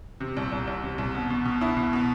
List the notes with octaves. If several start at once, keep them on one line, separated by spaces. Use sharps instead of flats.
C3
C2
C2
C2
C3
C2
B2
B2
B2
E4
B2
B2